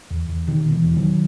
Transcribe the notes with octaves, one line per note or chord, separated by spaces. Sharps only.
E2
E2
B2 D#3
B2
E3
E2
D#3 F#3